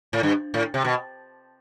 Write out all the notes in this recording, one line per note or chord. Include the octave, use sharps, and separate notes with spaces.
A2
G2
A2
C3
B2